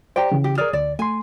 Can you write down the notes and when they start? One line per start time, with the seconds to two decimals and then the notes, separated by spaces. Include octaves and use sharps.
0.16 G4 C5 D5 G5 A#5
0.32 C#3 E3
0.44 G4
0.58 G#4 A#4 D5 F6
0.73 D2 D5
0.99 A3 G#5 C6